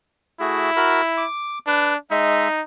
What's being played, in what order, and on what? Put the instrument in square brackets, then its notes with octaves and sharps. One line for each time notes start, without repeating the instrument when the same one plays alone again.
[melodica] A3 F#4 G#4 [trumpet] E4
[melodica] F#4 A#4 B5
D6
[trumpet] D4 [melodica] B4
[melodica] G#3 E5 [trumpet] D#4